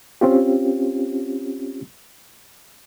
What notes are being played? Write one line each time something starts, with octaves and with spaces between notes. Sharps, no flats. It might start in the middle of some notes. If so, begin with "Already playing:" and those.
C4 C#4 F4 G4